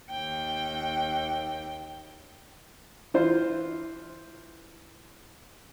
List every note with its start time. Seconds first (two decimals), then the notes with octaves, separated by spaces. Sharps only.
0.11 D#2 G5
3.14 E3 F4 C5